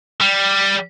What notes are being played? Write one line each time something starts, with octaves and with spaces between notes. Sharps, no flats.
G3